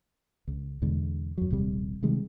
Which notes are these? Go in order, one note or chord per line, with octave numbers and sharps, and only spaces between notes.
C#2
E2 B2 D3 G#3
F2 F#3
D#1 A#1 C3 G3
C3 D#3 G3 G#3